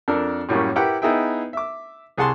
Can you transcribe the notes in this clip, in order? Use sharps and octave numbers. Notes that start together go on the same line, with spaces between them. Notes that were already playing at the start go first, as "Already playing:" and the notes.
F2 D4 A4 A#4
F#2 A2 G3 A#3 C#4
E4 G4 A#4 B4 F#5 G5
B3 D#4 E4 G#4 E5 G5
E5 D6
C2 G#4 F#5 A5 C6